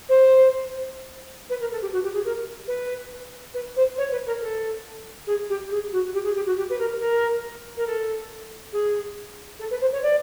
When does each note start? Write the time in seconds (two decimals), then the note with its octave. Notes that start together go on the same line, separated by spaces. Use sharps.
0.09 C5
1.49 B4
1.60 A#4
1.71 A4
1.82 G4
1.92 F#4
2.03 G4
2.13 G#4
2.24 A#4
2.67 B4
3.54 B4
3.76 C5
3.98 C#5
4.12 B4
4.26 A#4
4.41 A4
5.27 G#4
5.49 G4
5.70 G#4
5.92 F#4
6.14 G4
6.24 G#4
6.35 G4
6.46 F#4
6.57 G4
6.69 B4
6.78 A#4
7.00 A#4
7.77 A#4
7.87 A4
8.72 G#4
9.59 A4
9.70 B4
9.81 C5
9.92 C#5
10.02 D5